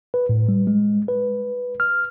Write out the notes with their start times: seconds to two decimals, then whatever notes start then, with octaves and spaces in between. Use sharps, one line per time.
0.14 B4
0.29 A2
0.49 G3
0.67 G#3
1.08 B4
1.80 F6